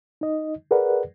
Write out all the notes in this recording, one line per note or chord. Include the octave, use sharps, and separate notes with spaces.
D#4 D#5
G#4 A#4 B4 D5 F#5